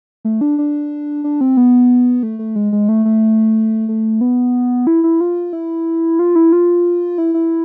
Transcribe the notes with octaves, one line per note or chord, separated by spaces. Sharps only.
A3
D4
D4
D4
C4
B3
A3
A3
G#3
G#3
A3
A3
A3
B3
E4
E4
F4
E4
F4
E4
F4
E4
E4